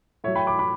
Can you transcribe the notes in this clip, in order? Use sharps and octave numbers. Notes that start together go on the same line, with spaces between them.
A2 F#3 C#5 E5
G5 B5
B5 D6
B5 D6